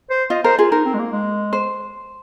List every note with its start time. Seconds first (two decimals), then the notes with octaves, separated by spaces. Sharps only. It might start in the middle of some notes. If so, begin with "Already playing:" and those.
0.10 C5
0.30 F4 D#5
0.44 A#4 C5
0.58 F4 G#4
0.71 D#4 A#4
0.85 C4
0.94 G#3
0.99 A#3
1.12 G#3
1.53 C5